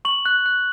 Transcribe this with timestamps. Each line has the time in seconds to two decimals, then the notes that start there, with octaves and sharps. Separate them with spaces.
0.05 C#6 F#7
0.26 F#6
0.46 F#6